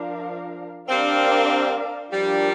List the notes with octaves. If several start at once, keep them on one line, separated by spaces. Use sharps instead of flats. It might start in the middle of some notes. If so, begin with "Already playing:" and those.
Already playing: F3 D4 A#4 F5
G3 C4 D4 A#4 D5 F5
F3 G3 D4 G4 A#4